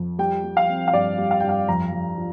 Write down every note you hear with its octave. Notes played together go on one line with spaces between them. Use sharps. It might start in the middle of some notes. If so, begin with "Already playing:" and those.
Already playing: F2
G3 G5
G3
F5
C4
F5
G2 D5
G3
F5
G2 G5
F5
F2 A#5
F2
F3